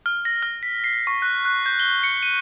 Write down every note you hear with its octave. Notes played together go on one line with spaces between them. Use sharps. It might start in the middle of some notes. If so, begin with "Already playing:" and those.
F6
A#6
F6
B6
C7
C#6
F#6
F#6
G6
G7
C#7
D#7